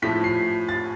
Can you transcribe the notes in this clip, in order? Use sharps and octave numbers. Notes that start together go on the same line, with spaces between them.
A2 F3 A3 B6
C7
A6